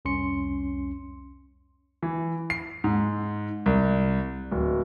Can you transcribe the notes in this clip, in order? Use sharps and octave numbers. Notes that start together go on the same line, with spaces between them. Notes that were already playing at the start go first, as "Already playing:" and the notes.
C2 F2 C#4 C6 C#7
E3
C7
G#2
C2
D1